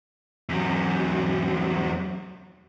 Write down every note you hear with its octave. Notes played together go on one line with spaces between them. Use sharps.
E2 F#3